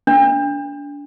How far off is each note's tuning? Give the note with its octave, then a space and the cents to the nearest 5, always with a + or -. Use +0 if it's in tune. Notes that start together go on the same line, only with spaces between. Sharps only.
D4 -30